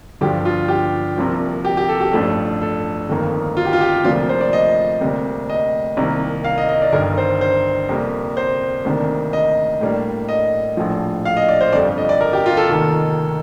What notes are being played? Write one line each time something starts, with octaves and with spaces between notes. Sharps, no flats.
G1 G2 F3 G4
F4
G4
C2 C3 F3 A#3
G4
G4
A4
G4
A1 G2 F3 A3 A4
A4
G1 F2 D#3 A#3
F4
G4
F4
G4
D2 C3 F3 A#3 D4 F4
C5
D5
D#5
D2 C3 G3 A#3
D#5
C2 C3 D#3 A#3
F5
D#5
D#5
D5
G1 G2 D#3 A#4
C5
C5
F2 C3 G3 A#3
C5
D2 C3 D#3 A#3 D4
D#5
A2 G3 A#3 D4
D#5
A#1 A2 F3
F5
D#5
D5
C5
G1 F2 D3 G3 D5
D#5
D5
A#4
G4
F4
A4
F1 D#2 D#3